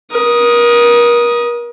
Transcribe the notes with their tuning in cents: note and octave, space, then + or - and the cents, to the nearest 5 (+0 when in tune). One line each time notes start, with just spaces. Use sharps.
A#4 +35 D#6 +0